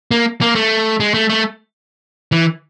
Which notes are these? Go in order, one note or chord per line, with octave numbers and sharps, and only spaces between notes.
A#3
A#3
A3
G#3
A3
A3
E3